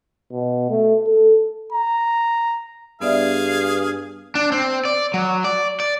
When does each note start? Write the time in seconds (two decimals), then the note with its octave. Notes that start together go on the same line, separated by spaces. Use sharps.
0.32 B2
0.70 A3
1.07 A4
1.72 A#5
3.02 G2 B3 G#4 D5 E5 F5
4.35 D4
4.52 C4
4.85 D5
5.14 F#3
5.44 D5
5.80 D5